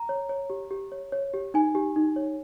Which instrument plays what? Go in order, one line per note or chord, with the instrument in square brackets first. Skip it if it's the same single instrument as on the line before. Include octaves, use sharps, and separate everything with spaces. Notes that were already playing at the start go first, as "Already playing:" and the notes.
Already playing: [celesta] A#5
C#5
C#5
G4
G4
C#5
C#5
G4
D#4 G#5
G4
D#4
C#5